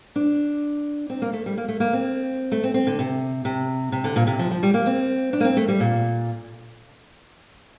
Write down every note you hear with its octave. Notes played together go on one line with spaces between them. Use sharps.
D4
C4
A#3
A3
G3
A#3
A3
A#3
C4
A3
C4
C4
D3
C3
C3
C3
D3
A#2
C3
F3
F3
G3
A#3
C4
D4
A#3
C4
A3
G3
A#2